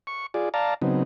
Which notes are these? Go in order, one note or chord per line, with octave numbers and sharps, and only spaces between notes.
C#6
F4 G#4 D5
D5 F5 A5 A#5
C#3 F#3 B3 C4 D#4